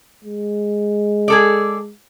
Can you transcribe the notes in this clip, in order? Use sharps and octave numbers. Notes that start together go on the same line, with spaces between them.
G#3
G#4 A4 D5